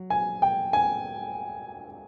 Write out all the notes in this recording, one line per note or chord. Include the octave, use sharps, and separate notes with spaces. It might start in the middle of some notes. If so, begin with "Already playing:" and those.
Already playing: F#3
G#5
G5
G#5